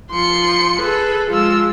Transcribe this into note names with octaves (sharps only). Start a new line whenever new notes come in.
F3 C6 C#7
G#4 A4 B4
F3 G#3 F4 E6